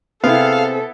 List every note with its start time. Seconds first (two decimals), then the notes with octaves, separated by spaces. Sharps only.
0.24 C3 B3 C4 E4 G#4 A4 F5